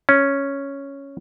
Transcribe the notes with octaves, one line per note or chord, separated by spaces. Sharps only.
C#4